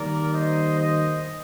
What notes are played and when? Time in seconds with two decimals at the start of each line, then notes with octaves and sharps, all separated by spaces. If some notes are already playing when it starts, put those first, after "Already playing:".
Already playing: D#3 G3 A#3 A#4 D5
0.33 C5 D#5
0.79 C5 D#5